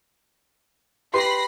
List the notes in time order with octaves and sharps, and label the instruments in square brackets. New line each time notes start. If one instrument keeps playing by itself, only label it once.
[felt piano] G4 B4 C6 [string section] B5 A#6 C7